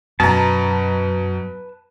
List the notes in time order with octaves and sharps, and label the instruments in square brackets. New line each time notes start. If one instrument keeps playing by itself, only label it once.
[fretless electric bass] F#2 [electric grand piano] B2 A#5 [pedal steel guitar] B4 A5